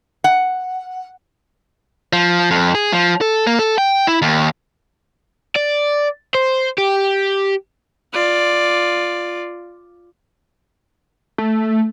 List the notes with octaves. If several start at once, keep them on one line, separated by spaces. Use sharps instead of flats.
F#5
F3
F2
G#4
F3
A4
A#3
A4
G5
E4
D#2
D5
C5
G4
F4 D5
A3